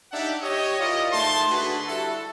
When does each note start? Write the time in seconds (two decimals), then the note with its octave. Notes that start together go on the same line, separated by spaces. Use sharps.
0.12 D4 D#4 G4 D5 E5 F#5
0.42 G4 C#5 D#5
0.80 E4 F4 A#4 D5 D#5
1.11 G#2 A3 A5 C6
1.50 D3 F#4 G#4 A4 B4
1.87 G3 E4 F#4 A4